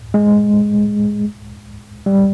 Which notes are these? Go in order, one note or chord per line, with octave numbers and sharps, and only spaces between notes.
G#3
G3